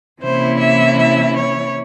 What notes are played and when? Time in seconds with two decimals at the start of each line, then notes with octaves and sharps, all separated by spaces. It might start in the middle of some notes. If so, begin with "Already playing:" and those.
0.22 C3 E3 A#3 C#4 E4 C5
0.60 E5
0.98 E5
1.36 C#5